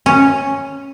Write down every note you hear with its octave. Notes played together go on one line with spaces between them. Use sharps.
C#4